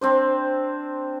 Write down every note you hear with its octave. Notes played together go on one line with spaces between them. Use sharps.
C4 D4 C5